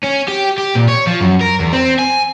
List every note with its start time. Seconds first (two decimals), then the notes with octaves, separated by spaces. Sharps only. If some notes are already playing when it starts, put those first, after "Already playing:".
0.04 C#4
0.28 G4
0.58 G4
0.75 A#2
0.88 C#5
1.07 F3
1.21 F#2
1.41 A#4
1.60 E2
1.73 C4
1.99 G#5